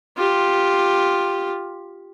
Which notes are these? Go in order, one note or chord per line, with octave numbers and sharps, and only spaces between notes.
F4 G4